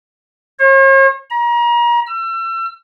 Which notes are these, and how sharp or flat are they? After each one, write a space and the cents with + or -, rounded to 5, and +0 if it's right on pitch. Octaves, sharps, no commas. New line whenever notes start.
C#5 -45
A#5 +35
E6 +35